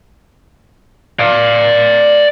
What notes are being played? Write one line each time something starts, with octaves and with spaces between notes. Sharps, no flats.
D5 F5